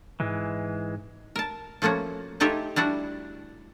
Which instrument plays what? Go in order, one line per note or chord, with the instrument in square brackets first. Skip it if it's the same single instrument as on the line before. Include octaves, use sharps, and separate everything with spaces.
[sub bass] G#2 [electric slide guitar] E3 G#3
[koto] A#4 A5
F3 A3 A#3 C#4 F#4
A3 D#4 F4 G4 G#4 E5
G3 D4 E4 F#4